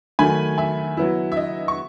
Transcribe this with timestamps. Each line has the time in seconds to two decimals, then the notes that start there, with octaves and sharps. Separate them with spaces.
0.19 D#3 F#3 A3 G#5 B5
0.58 E5 G#5
0.97 F#3 B3 E4
1.32 E5
1.37 D#5
1.68 C#6